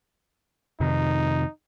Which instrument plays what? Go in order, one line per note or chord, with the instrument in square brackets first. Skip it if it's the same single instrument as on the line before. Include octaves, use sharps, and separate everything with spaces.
[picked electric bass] F2 C3 D#3 [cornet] D#4